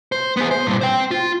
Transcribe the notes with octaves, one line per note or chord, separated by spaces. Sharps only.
C5
B3 G#4
C5
G2 A#2
C5 G5
F4